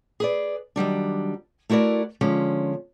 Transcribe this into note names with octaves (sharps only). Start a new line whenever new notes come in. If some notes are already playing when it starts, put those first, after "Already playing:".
G#4 B4 D5
D#3 F#3 G3 D4
A3 E4 F#4 A#4 D5
D3 F3 G#3 C#4